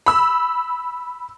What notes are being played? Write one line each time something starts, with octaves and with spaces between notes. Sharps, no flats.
B5 E6